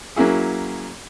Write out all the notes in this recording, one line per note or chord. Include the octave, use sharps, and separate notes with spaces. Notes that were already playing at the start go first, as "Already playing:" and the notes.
F#3 A#3 C#4 E4 G#4